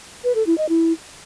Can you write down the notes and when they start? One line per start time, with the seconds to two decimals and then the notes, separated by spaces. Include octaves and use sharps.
0.24 B4
0.35 A4
0.46 E4
0.58 D#5
0.69 E4